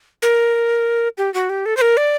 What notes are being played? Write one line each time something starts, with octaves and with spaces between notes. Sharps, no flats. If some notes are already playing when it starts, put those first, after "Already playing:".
A#4
G4
F#4
G4
A4
C5
A#4
D5